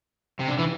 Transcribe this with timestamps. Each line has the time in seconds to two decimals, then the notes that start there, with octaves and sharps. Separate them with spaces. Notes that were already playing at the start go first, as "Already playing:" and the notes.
0.40 C3
0.48 D3
0.59 E3